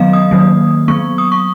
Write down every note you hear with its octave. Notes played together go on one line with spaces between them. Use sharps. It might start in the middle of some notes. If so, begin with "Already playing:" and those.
Already playing: D#3 F#3 B3 D#5 F5
D#6
D#3 F#3 A#3
F#3 B3 C#6
D#6
C#6